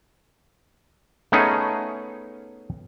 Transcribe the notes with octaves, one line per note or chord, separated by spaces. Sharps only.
A3 B3 C#4 D#4 G#4